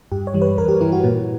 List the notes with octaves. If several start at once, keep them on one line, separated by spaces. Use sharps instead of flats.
G2 G4
C#5
E3 G3
B4
G2 A#4
G4
E3 G3 E4
F#4
A#2